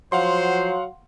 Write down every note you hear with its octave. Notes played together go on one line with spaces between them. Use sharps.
F3 F#3 C5 F5 F#5 C6